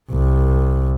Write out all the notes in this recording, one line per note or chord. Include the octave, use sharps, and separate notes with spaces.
C2